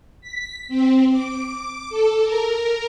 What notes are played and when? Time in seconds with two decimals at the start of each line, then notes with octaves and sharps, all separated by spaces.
0.21 B6
0.68 C4
1.10 D6
1.89 A4
2.23 A#4